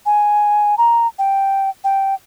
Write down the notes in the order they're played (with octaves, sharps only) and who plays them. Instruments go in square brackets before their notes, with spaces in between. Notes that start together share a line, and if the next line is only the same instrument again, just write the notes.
[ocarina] G#5
A#5
G5
G5